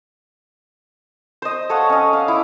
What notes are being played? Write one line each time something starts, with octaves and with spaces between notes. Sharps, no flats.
C5 D#5
A4 C#5 F5 F#5
C#4 D#5
F5
E4 D6